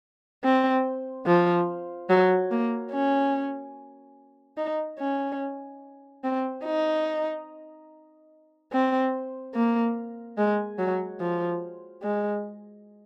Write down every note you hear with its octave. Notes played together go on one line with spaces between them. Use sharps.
C4
F3
F#3
A#3
C#4
D#4
C#4
C4
D#4
C4
A#3
G#3
F#3
F3
G#3